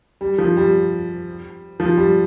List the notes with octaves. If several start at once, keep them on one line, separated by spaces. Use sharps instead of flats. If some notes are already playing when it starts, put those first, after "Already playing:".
G3
F3
G3
F3
G3